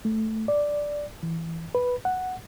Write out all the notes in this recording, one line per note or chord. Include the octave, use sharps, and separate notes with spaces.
A3
D5
E3
B4
F#5